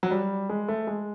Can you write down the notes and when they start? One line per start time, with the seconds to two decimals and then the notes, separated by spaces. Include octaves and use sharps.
0.03 F#3
0.11 G3
0.49 G#3
0.68 A3
0.87 G#3